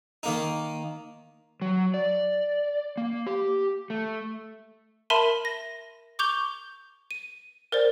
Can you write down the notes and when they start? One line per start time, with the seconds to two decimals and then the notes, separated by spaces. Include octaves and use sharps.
0.23 D#3 A#3 D#4
1.62 F#3
1.94 D5
2.97 A#3
3.27 G4
3.90 A3
5.10 A#4 E5 A5 B5 C6 D#7
5.45 A#6
6.19 C#6 D6 G6 F7 G7
7.11 D#7
7.72 A#4 C5 D5